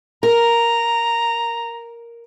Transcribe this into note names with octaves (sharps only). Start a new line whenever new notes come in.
A#4 A#5